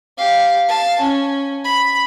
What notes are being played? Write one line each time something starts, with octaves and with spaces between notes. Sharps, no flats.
G4 F5
F5 A5
C#4
B5